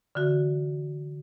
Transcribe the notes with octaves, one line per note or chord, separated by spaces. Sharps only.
D3 E3 F#4